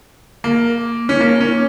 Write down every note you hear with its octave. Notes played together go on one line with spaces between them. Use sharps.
A#3
C#4
A#3
C#4